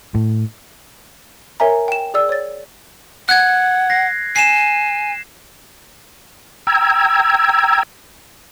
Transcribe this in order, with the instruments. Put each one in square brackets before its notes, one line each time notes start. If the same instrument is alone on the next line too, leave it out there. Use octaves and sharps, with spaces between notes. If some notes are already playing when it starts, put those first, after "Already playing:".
[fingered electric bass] A2
[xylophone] A#4 C#5 E5 G#5 A#5
G5 E7
G#4 D5 E6
C#5 A6
[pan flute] F#5 [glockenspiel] F#6 G#6
[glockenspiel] A#6 C7
[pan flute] G#5 [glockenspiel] C7 E7
[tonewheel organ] G5 A#5 E6 G#6